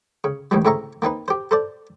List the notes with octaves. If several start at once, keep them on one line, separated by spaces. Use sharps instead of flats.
C#3
A1 G2 D#3 E3 G3
A2 C#3 C4 E5 A#5 C#6
A#3 C4 D#4 B4
G4 C5
A4 C5 D5